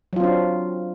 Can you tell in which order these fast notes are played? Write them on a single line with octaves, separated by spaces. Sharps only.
F#3 F4 C4 D4